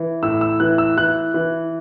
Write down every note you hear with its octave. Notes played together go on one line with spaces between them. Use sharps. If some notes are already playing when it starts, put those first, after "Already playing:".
Already playing: E3
A2 E6
E6
E3 F#6
E6
E3 F#6
E3